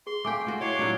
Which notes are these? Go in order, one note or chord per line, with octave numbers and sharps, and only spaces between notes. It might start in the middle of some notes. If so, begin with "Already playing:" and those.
G#4 C6
A3 F5 G5 G#5 D6
F4 F#4 C5
E4 C#5 D#5 C6 D6
A#2 F#3 D4